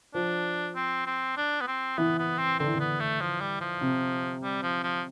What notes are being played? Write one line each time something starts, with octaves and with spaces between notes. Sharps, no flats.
F3 D4
C4
C4
D4
B3
C4
E3 B3
B3
C4
D3 C4
E3
D3
B3
A3
F3
G3
F3
C3
G3
F3
F3